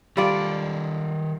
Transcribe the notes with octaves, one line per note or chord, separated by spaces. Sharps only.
D#3 G3 F4 A4 D5